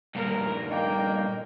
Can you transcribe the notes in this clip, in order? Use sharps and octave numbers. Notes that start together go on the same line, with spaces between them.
G2 A#2 A#4
A#3 D#5 G5